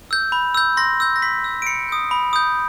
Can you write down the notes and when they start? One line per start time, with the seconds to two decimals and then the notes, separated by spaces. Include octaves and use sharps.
0.11 E6 G6
0.32 B5
0.55 E6 G6
0.77 C6 A#6
1.00 E6 G6
1.16 A#6
1.22 C6 B6
1.44 E6 G6
1.62 D7
1.66 B5 C#7
1.89 D#6 G6
2.11 B5
2.33 D#6 G6